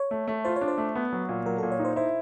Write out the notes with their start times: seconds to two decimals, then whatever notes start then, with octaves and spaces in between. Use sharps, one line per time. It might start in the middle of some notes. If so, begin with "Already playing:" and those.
Already playing: C#5
0.11 A3
0.28 A3
0.45 F4 C5
0.56 C#5
0.61 D4
0.68 C5
0.78 A3
0.95 B3
1.13 F#3
1.29 A#2
1.46 F#3 A#4
1.58 A#2 A4
1.72 C#5
1.79 D#4
1.85 C5
1.96 E4 C5